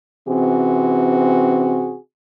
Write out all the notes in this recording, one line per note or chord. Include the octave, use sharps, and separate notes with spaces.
C3 E3 C4 C#4 F#4 G#4